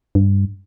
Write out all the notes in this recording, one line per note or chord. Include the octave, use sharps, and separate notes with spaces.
G2